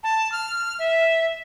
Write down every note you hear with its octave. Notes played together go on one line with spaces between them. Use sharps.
A5
F6
E5